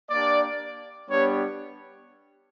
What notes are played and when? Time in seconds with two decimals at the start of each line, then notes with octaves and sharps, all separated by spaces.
0.10 A#3 D4 G4 D5
1.09 G3 B3 D4 G4 C#5